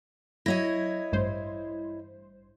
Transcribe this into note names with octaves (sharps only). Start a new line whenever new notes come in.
F#3 E4 C#5 D#5 A#6
A1 G2 C5